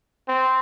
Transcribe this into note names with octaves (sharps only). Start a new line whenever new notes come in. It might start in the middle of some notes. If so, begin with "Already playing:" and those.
C4